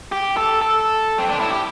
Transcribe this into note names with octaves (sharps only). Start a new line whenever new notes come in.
G4
A4
A4
C4
D4
E4
G4